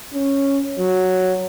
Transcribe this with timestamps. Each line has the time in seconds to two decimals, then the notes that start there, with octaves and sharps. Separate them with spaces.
0.14 C#4
0.79 F#3